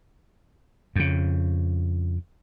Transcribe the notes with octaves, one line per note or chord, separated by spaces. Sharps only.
F2 C#3